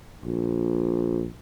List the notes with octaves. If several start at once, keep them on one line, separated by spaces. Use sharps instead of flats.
A#1